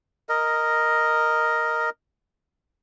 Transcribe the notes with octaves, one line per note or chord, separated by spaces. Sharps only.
A#4 D#5